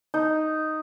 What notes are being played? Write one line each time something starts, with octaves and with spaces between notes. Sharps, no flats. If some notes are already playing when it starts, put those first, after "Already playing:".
D#4